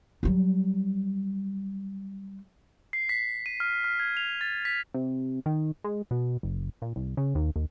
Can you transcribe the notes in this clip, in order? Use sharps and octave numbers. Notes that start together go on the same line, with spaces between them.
F#3 G3
C7
B6
D#7
F6
F6
G#6
F7
A6
B6
C3
D#3
G#3
B2
F#1
A#2
C2
C#3
D#2
D#2